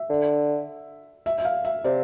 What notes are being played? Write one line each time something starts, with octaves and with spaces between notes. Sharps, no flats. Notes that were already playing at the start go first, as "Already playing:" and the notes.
Already playing: E5
D3
E5
E5
F5
E5
C3 D5